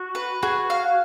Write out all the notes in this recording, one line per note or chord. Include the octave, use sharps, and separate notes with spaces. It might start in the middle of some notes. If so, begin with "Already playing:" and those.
Already playing: F#4
B4
F#4 G#4
F5